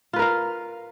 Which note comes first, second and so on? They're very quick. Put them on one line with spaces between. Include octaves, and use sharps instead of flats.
F4 B4 A#4 F5